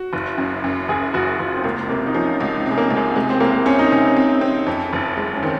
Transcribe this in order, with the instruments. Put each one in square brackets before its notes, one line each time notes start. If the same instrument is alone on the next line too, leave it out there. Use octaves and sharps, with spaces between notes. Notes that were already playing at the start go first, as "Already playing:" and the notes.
Already playing: [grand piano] F#4
[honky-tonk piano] F#1
F#2
F#2
[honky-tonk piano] F#1 [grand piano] G#4
[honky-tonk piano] F#1 [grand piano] F#4
[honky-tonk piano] F#1 [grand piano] F4
[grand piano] C4
[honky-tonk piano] C#2 [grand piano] A#3
[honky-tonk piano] C3 [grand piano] A#3
[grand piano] D#4
[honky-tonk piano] F3 [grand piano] C#4
[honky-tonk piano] C#2 [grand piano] D#4
[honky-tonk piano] C3
[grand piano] G#3
A#3
[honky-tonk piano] C#2
[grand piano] G#3
[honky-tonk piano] C3 [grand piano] G#3
[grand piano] C4
[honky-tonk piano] C2 [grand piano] A#3
[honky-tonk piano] C4 [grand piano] C#4
[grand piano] D#4
[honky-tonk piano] C3 [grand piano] C#4
[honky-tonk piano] C4
C4
F2
F#1
G#3
[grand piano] C#4
[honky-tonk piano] D#3 [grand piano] C4